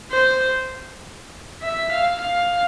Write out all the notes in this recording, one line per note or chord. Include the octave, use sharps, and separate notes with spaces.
C5
E5
F5
F5